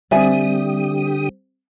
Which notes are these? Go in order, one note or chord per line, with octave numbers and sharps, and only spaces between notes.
D3 G3 C4 G4 D5 E5 G#5 D#6